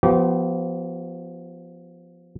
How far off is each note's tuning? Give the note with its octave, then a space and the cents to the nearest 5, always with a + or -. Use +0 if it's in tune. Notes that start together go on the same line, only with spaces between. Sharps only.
F3 +0 B3 +0 G4 -35